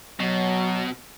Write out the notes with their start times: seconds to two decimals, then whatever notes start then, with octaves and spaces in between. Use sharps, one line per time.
0.20 B2 F#3